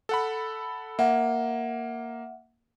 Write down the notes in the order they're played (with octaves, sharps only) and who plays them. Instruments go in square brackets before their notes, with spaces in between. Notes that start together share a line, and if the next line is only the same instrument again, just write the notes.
[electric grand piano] A4 F#5 B5
[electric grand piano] A#3 [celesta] E5 F#5